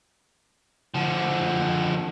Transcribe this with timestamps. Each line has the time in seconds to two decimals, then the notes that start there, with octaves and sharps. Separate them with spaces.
0.94 D3 F3